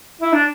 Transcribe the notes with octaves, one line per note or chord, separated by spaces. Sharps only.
E4
D4